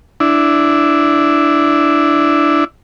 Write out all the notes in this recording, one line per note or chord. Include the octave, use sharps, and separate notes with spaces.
D4 E4